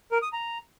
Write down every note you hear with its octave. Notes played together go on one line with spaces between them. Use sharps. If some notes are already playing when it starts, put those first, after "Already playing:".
A#4
D#6
A#5